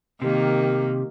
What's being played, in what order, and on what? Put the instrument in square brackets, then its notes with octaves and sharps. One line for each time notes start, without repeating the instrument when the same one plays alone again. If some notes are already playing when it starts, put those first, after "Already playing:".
[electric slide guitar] C3 [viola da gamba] D#3 A#3 [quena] G4